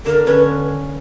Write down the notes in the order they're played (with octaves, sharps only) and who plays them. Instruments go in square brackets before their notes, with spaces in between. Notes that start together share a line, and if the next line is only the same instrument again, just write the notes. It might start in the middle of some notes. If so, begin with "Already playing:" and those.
[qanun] D3 [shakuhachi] A#4
[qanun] C#4 [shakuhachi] B4